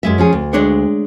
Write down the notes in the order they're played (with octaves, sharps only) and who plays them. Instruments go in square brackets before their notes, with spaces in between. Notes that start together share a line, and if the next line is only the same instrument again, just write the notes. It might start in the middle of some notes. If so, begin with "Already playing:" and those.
[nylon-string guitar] F#2 G#3 E5
F3 C#4 G#4
D2
[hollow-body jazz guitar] G#3 D4 C#5